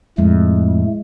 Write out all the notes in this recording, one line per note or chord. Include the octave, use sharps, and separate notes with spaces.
F2 A2 G#3 A3